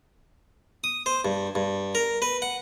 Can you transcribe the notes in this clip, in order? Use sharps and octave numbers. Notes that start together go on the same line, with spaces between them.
D#6
C5
G2
G2
A#4
B4
F#5